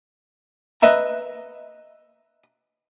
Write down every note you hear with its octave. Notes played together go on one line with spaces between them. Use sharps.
B4 D#5 E5 A#5